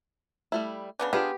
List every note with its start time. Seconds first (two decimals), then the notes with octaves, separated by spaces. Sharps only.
0.52 G3 A3 E4
0.99 C#3 B3 D4
1.13 B3 D4 F4 G4 G#4